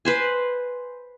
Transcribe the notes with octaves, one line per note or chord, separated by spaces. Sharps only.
B4 C5 G#5